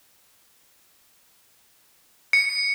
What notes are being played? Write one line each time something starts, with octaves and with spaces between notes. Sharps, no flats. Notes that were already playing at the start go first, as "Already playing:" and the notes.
C#7